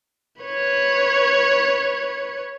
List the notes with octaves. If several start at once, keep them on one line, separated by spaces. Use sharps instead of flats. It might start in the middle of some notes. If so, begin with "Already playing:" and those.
B4 C#5